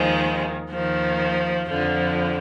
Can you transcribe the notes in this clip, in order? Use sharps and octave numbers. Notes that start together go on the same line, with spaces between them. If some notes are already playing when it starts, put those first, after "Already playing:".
Already playing: D#2 D#3 F3 G#3
D#2 D#3 F3
F2 D3 F3